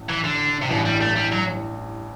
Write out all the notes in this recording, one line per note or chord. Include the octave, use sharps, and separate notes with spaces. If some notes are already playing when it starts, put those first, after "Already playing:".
Already playing: A1
E3
D3
C3
A1 G2 B2 E3
G3
A3
G3
F#3